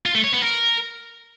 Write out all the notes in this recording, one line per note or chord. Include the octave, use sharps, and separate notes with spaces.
F4
A3
C#5
B3
A#4